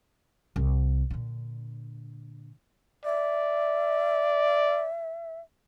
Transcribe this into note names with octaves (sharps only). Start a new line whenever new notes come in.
C2
A#2 D3
D5 E5